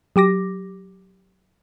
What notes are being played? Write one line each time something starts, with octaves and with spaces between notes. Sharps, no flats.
F#3 G4 D6 A#6